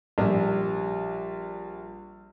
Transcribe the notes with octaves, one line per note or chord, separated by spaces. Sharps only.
A#1 G3